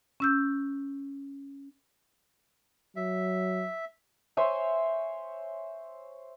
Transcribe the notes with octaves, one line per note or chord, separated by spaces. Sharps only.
C#4 E6 G6
F#3 E5
C5 C#5 E5 G#5